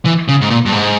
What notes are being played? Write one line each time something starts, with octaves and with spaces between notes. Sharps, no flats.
E3
C#3
G#2
A#2
G2
G#2